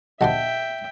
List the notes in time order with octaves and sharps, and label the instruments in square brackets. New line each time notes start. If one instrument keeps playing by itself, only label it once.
[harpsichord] A#1 D#2 C5 [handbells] D#5 F#5 A5 [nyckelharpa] E5 G5